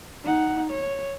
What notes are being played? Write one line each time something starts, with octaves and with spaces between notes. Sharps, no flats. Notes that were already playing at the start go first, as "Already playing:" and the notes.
D#4 F#5
C#5